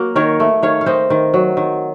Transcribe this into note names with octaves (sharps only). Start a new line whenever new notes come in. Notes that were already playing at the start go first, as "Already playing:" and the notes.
Already playing: F#3 A#3 F#4
D#3 A#4 C#5
A3
D#3 C#5 F5
F5
C4 C5 D#5
D#3
F#3
D#3